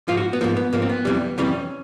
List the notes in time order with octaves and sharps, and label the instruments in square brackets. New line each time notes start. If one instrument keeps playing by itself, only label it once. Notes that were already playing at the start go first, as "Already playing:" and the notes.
[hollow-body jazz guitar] G#2 F3 F4
F#4
B3
G#2 F3 A#3
B3
G#2 F3 A#3
C4
B3
F2 C3 E3 G3
F2 C3 E3 G3 C#4